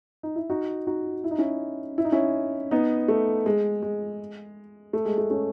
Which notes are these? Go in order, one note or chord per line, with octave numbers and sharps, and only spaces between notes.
D#4
E4
D#4 F#4
D#4 F#4
E4
D#4
C#4 E4
E4
D#4
C#4 E4
B3 D#4
A3
G#3
G#3
A3
G#3
A3
A3 C#4